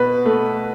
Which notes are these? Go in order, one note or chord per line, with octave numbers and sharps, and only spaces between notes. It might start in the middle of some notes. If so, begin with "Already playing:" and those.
Already playing: B2 B4
A3